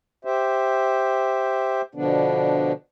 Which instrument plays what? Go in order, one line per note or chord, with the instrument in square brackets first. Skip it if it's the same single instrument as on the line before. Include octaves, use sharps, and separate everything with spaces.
[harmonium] G4 C5 E5
B2 D3 F3 B3 D4